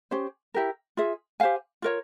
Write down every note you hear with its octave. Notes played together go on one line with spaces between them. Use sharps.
C#4 G4 C5
E4 G4 A#4
F4 G#4 E5
G4 C5 F5 G#5
F4 A#4 C#5